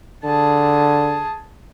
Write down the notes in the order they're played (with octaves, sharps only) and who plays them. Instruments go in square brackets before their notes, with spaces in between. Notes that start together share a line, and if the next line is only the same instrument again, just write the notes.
[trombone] D3 [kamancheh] G#4 A5